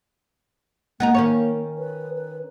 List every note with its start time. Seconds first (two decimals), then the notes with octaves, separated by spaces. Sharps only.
1.00 A#3 B3 D#4 A#4
1.15 D#3 C#4 C#5
1.78 B4
2.14 B4